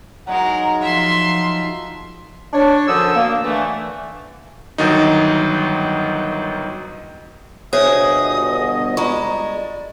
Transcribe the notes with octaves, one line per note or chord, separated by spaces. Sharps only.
F#3 G#3 D#4 G#4 A#4 F#5
F3 F4 E5 F#5 C6
D4 C#5
F#2 D3 F3 D#6 E6
A#3
D3 E3 A3
G1 D#3 F#3 D#4
G1 B2 G#4 C5 C#5 D#5 E5 D#6
G#3 F4 D5 A#5 C#6